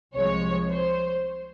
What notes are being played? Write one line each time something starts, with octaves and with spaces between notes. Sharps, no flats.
C2 C3 F3 G#3 C#5
C5